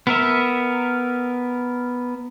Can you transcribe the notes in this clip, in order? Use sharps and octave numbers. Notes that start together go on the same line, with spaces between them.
B3 A#4 E5